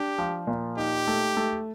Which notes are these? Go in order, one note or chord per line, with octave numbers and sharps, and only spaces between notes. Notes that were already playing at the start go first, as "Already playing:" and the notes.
Already playing: D4 G4
F3
A#2
D#4 G4
A3
A3